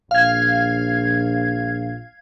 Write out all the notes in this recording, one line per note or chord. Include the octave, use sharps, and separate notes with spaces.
A#1 F5 G#6